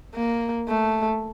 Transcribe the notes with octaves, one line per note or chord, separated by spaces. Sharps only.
A#3
A3